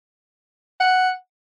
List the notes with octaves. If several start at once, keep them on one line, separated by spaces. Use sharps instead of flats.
F#5